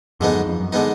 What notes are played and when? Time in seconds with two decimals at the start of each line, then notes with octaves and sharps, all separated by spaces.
0.20 F2 G#2 D3 G#3 B3 D#4
0.34 F#2
0.46 F2
0.60 F#2
0.72 D3 G#3 B3 D#4